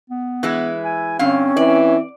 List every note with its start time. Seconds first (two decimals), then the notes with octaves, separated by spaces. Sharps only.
0.10 B3
0.43 E3 G#3 E4
0.85 G#5
1.19 G2 D3 C4 C#4 F5
1.57 E3 D5